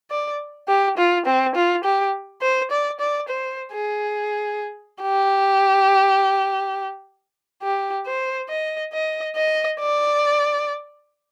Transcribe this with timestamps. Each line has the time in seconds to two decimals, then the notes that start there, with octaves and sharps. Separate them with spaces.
0.11 D5
0.68 G4
0.98 F4
1.26 C4
1.55 F4
1.84 G4
2.42 C5
2.71 D5
3.00 D5
3.29 C5
3.72 G#4
5.02 G4
7.63 G4
8.07 C5
8.49 D#5
8.93 D#5
9.36 D#5
9.79 D5